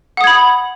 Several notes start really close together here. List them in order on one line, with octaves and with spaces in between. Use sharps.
F#5 D#6 G#6 B5